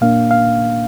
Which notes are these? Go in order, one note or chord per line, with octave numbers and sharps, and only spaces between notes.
A#2 A#3 D4 F5
F5